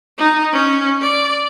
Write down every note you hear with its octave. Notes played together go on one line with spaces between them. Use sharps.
D#4
C#4
D5